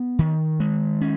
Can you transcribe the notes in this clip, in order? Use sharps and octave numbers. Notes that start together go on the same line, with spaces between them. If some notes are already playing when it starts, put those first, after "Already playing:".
Already playing: B3
D#3
G#3
C#4